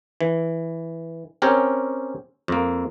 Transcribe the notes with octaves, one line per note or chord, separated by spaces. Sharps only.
E3
C4 C#4 G4 A#4 C#5
F2 A#3